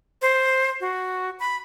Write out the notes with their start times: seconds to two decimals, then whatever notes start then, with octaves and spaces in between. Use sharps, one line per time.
0.22 C5
0.81 F#4
1.40 B5